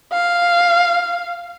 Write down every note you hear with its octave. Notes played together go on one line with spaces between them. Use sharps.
F5